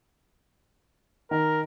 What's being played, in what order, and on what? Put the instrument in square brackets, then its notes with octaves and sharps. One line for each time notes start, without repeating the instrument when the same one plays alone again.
[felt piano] D#3 [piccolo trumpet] A#4